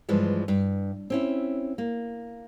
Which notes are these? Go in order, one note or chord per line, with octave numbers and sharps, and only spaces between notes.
G2 E3 F3 G#3
G2
C4 C#4 E4
A#3